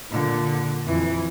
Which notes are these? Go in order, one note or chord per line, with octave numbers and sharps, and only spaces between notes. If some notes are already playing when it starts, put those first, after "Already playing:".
A#2 D3
F2 E3